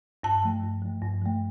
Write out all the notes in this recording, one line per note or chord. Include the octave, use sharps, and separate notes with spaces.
G2 A5
F3 A3
G2
F3 A3
G2
F3 A3